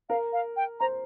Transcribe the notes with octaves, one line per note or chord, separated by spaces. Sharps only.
A#4 F5
F5
G5
C5 A#5